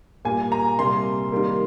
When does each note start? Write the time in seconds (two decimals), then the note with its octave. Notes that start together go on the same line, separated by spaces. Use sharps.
0.25 A#2 G3 A#3 G#5
0.52 A#5
0.78 C3 G3 A#3 C6
1.32 D#3 G3 A#3